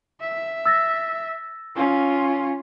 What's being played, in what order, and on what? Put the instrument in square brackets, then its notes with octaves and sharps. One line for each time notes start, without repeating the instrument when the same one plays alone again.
[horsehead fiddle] E5
[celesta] E6 A6 A#6
[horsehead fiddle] C#4 F4